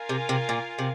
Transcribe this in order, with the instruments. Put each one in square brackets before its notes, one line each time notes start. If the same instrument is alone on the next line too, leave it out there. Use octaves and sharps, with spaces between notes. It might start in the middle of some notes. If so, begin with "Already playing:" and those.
Already playing: [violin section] F4 A#4 F5 G#5
[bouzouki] C3
C3
A#2
C3